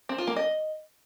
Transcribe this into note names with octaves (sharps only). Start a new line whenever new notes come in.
C4
F4
A#3
D#5